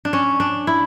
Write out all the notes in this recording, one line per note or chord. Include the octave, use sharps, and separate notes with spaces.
D4
C#4
D4
E4